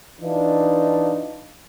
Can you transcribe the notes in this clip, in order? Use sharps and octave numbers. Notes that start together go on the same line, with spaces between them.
E3 D4 D#4 F4